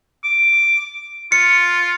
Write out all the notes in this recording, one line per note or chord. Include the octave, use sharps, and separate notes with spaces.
D6
F4 C#7